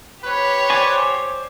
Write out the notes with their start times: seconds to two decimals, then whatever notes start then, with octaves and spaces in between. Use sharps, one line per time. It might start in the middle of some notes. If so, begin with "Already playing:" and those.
0.24 G4 B4 C#5
0.70 C5 D5 G#5